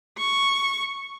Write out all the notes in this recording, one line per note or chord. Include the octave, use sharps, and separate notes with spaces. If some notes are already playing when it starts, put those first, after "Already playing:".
C#6